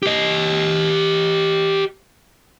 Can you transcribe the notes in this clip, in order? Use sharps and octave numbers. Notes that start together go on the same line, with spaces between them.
G4 D#5